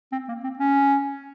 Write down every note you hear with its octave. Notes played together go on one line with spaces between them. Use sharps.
C4
A#3
C4
C#4